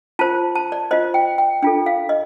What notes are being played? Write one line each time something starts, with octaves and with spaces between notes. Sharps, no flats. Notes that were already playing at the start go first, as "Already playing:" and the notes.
F4 C5 A5
A5
D5
F4 C5 D#5
G5
G5
D4 F4 A4 G5
F5
D#5